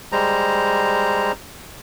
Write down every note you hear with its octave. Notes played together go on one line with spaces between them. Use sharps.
G3 G#3 C5 A#5